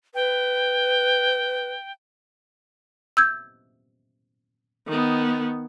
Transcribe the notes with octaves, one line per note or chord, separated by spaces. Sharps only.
B4 G5
E6 G6 G#6
D#3 B3